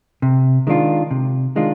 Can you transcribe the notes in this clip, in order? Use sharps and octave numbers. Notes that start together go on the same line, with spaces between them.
C3
D#3 G#3 D4 F4
C3
D#3 G#3 D4 F4